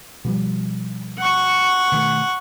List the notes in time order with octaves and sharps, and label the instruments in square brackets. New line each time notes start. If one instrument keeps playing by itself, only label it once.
[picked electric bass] B2 F3 G3
[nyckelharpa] F#5 C#6
[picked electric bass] B2 D#3 A3